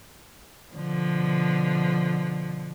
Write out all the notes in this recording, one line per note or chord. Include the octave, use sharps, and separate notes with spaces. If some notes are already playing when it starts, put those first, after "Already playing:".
B2 D3 F3